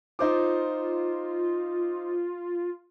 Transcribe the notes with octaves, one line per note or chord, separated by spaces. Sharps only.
D#4 F4 C5 D6